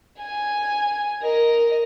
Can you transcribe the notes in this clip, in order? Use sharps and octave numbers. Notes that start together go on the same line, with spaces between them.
G#5
A#4 D#5